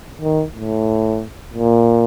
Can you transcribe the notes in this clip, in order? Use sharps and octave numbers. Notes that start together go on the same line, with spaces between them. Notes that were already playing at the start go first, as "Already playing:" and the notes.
D#3
A2
A#2